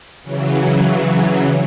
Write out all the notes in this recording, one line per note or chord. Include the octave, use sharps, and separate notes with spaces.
C#3 E3 F#3